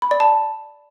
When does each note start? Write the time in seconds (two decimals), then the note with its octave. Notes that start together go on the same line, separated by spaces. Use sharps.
0.02 B5
0.11 D5
0.20 A5